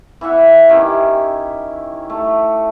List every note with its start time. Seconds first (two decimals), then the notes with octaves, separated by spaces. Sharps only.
0.21 E3 E4 E5 F#5
0.69 D#3 C#4 E4 G4
2.10 A3